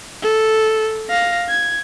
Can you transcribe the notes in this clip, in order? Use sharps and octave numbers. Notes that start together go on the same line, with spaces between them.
A4
F5 A#6
G#6